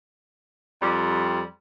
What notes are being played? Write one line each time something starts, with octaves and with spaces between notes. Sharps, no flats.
F2 G3